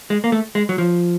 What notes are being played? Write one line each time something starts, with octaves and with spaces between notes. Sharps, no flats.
G#3
A#3
A3
G#3
F#3
F3